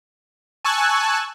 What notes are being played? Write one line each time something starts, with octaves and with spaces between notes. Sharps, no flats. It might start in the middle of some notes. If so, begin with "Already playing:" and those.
G#5 A5 C#6 E6 F#6 G#6